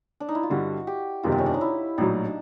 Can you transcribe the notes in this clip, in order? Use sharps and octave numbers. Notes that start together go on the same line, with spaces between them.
D4
D#4
E4
F4
G2 D3 G3 F#4
G4
F#1 E2 C3 D#3 G3 F4
C4
C#4
D4
D#4
E4
A#1 A2 F#3 D#4
D4